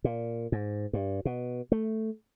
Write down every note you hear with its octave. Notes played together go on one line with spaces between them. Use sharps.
A#2
G#2
G2
B2
A3